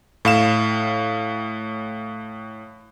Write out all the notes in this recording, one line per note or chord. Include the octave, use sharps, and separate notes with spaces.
A2 F5 E7